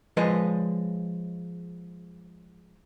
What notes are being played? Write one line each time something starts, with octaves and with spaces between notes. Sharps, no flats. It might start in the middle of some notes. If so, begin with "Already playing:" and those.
F3 G#3 B4 D#5